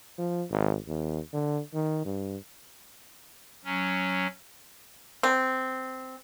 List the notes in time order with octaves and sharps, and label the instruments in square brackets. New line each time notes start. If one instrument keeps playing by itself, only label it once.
[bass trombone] F3
G#1
D#2
D3
D#3
G2
[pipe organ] F#3 C#4
[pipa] C4